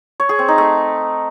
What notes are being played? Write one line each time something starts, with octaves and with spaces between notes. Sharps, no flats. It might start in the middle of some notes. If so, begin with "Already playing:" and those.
C#5
G#4
C4
D#4
A3